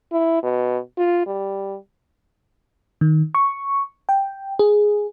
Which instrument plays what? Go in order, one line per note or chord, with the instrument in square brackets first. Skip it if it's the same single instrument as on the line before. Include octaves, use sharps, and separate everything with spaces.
[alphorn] E4
B2
F4
G3
[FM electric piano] D#3
C#6
G5
G#4